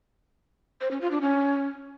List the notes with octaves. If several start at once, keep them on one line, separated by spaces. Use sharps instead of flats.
C5
C#4
F4
D4
C#4